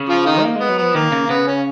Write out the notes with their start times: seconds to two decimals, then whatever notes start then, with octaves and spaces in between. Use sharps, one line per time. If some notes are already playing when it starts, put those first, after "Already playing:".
Already playing: C#3
0.09 F3 F4
0.26 D#3 D#4
0.42 A#3
0.56 G#3
0.61 B3
0.69 F#3
0.78 F3 B3
0.95 D#3 A#3
1.12 C#3
1.29 C#3 B3
1.47 C#4